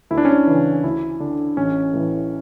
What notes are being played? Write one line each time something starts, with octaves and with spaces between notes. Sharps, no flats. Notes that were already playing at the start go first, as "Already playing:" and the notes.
D2 E4
D4
C#4
D4
C#3 E3
D2 E4
D3 D4
A1 C#4
A2 E3